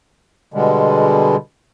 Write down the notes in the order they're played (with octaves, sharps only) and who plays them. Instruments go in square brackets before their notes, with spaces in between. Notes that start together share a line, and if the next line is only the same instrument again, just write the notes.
[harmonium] B2 D3 G3 G#3